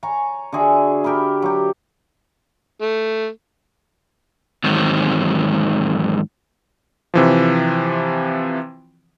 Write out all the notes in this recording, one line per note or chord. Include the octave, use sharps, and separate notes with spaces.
C#5 G#5 A#5
D3 F#4 G#4 E5
G4 A#4 G5 B5
F#3 G4
A3
E2 G#2 D#3 F#3 C4
C3 E3 F3